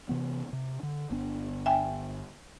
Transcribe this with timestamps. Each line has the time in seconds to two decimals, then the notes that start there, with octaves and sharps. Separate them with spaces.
0.09 C3 E3 B3
0.53 C3
0.83 D3
1.11 G1 B3 D4
1.66 E5 G5 G#5